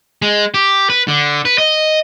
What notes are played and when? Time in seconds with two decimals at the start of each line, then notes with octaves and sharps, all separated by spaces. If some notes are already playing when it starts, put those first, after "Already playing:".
0.22 G#3
0.54 G4
0.90 B4
1.08 D3
1.45 B4
1.58 D#5